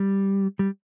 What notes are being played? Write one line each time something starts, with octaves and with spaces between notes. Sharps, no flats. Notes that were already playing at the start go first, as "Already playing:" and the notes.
Already playing: G3
G3